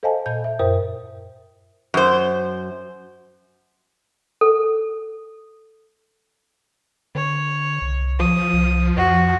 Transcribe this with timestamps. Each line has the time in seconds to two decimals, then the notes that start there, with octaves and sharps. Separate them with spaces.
0.03 A4 C5 D#5 F5 G#5 A5
0.26 A#2 G6
0.44 E5
0.59 F#2 A#4 C5 E5 D#6
1.94 F#2 C5
4.41 A4
7.15 D3 C#5
7.82 C2
8.20 F3 D#6
8.53 C2
8.97 F2 F#4